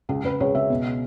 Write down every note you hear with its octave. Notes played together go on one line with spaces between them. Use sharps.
C#2 G#4
C#2 B4
C#2 C#5
C#2 E5
B2